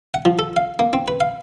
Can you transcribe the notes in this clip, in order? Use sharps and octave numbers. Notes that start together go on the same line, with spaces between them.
F#5
F3
A4
F5
A#3
C4
B4
F5